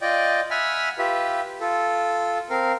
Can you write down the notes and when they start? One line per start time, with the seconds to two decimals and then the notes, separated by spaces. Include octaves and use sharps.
0.01 F4 D5 D#5 G5
0.51 E5 F#5 G#5 B5 F6
0.98 F4 G4 B4 E5
1.61 F4 A4
2.50 C4 A#4 F5